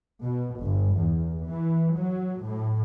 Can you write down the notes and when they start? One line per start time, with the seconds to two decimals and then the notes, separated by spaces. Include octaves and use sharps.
0.23 B2
0.60 G1
0.97 E2
1.47 E3
1.96 F#3
2.43 A2